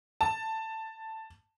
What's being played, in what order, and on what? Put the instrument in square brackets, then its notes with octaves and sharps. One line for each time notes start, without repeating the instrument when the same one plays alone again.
[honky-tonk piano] A5